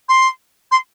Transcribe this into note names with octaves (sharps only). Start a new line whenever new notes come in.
C6
C6